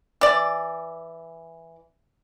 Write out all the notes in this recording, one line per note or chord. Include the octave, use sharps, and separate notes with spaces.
E3 D5